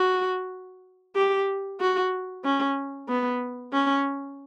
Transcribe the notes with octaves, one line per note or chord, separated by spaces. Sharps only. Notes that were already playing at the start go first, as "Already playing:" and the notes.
Already playing: F#4
G4
F#4
C#4
B3
C#4